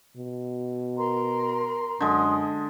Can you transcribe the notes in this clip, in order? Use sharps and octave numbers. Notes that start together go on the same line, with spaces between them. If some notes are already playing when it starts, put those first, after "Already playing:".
B2
A#4 A#5 C6
F#2 D3 G#3 C6 D#6